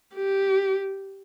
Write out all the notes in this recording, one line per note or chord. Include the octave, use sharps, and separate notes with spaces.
G4